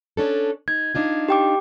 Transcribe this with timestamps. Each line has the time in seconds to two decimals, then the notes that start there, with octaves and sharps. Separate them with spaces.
0.17 C#4 D4 A4
0.68 D#4 G#6
0.95 D4 D#4 F4
1.29 G4 G5 D6